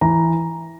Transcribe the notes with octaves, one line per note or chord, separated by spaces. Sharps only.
E3 A#5